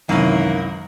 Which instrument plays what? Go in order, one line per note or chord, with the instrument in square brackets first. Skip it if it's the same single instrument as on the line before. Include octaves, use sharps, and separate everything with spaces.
[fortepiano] C2 F#2 [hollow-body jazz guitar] D#3 E3 [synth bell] F#3 G#3 F#7 [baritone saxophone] A#3